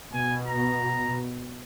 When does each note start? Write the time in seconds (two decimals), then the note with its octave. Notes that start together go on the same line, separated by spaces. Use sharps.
0.13 B2 G#5
0.47 A#5